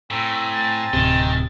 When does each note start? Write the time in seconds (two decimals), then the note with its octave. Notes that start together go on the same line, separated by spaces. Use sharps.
0.11 A2 C4 G#5 A#5 E6
0.52 A6
0.93 D1 C3 D#3